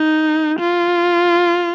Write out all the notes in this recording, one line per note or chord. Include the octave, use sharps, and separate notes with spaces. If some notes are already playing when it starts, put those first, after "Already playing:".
Already playing: D#4
F4